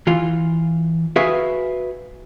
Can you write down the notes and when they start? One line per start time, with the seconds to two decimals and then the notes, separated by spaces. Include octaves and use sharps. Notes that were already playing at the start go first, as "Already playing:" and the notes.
0.07 E3 F4
1.16 F#4 G#4 B4 E5 F5